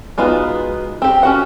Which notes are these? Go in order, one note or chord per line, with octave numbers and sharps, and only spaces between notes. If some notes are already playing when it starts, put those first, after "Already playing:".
G#3 B3 D#4 F4 F#4
C4 G4
C#4 F#4 F#5